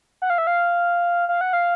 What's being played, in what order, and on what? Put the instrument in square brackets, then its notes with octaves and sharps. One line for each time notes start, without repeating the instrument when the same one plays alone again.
[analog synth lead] F#5
F5
E5
F5
F5
F#5
F5